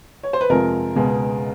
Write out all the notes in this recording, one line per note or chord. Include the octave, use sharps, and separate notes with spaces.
C#5
C5
B4
F2 C3 F3 G#3 A#4
C#2 B2 G#3